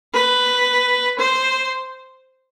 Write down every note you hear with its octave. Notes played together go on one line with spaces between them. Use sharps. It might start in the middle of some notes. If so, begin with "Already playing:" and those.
B4
C5